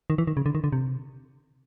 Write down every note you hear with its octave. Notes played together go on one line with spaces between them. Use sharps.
D#3
E3
D#3
C#3
D3
D#3
D3
C3